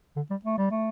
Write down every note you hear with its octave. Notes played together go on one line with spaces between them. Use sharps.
D3
G3
A3
G3
A3